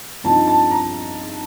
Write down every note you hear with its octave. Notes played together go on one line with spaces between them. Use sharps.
G2 F3 C4 D#4 A5
A5
A#5